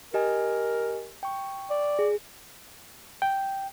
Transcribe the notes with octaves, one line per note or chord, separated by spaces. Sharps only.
G4 A#4 D#5 G#5
G5 C#6
D5
G#4
G5